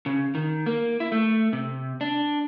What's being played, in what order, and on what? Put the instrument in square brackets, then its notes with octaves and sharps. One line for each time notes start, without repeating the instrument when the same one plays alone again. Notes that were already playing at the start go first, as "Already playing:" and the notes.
[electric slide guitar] C#3
D#3
A#3
E4
A3
C3
D4